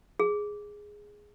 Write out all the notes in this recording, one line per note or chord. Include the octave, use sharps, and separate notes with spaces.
G#4